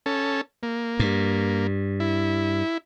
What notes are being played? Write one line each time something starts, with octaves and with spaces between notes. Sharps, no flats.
C#4 A4
A#3
G2
E4